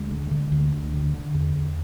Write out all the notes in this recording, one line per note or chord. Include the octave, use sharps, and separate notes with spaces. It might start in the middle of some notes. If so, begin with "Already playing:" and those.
Already playing: D2 G#3
D3
D3
D2
D2
D3
D3
E2
E2